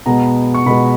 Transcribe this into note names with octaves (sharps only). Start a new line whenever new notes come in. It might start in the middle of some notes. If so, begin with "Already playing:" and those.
B2 G#3 B3 A#5
C#6
B2 G#3 B3 B5